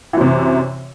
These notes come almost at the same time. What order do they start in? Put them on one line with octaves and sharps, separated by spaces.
E3 F#2 C3